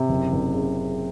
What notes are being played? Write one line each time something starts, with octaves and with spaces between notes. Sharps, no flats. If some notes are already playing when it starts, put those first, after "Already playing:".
Already playing: C3
F#1
F#1
C#3